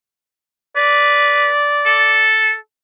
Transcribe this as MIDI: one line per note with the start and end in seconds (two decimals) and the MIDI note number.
0.76 1.49 71
0.76 2.28 74
1.86 2.56 69